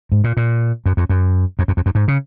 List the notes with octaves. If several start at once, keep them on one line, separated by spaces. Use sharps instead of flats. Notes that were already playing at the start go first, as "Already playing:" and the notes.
G#2
A#2
A#2
F#2
F2
F#2
F2
F#2
F2
F#2
G#2
C#3